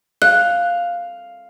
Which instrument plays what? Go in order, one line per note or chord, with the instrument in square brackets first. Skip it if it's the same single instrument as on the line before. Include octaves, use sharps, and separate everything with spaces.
[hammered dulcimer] F5 [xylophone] F#6